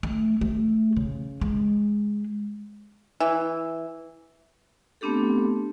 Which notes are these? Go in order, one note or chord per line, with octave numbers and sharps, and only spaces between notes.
A3
A3
C#3
G#3
E3
A3 B3 C4 D4 G4 A4